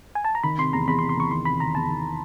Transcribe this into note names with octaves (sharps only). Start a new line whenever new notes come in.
G#5
A5
A#5
D#3 B5
C3 C6
E2 A#5
E2 B5
C6
C3
C6
E2 C#6
D#3 C6
C3 B5
D#3 A#5
E2 A5
D#3